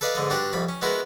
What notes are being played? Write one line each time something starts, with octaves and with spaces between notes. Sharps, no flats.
A4 B4 D5 D#5 F5
G#2 D3 D#5
G2 D4 F#4 G4 F#5
C2 F2 B5
C#4
G#3 B3 E4 F#4 A#4